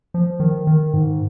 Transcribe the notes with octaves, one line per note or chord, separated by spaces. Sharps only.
F3
D#3
D#3
G#2